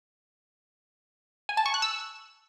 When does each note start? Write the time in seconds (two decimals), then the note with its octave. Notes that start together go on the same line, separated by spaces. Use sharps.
1.49 G#5
1.57 A5
1.66 C#6
1.74 F#6
1.82 E6